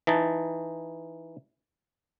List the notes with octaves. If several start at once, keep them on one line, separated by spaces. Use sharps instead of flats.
E3 D#4 A5